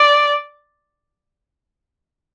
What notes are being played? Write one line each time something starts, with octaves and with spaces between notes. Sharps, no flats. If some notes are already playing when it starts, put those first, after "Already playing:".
Already playing: D5